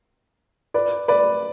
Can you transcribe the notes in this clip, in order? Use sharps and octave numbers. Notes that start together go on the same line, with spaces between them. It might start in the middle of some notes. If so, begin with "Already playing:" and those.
B4 D5
B4 D5